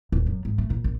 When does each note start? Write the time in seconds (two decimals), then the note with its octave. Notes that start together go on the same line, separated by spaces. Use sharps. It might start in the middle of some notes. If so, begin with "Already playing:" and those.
0.12 D#1
0.26 F#2
0.45 G#2
0.58 A3
0.70 A#2
0.84 A#1